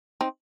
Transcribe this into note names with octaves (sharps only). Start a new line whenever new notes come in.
C4 D#4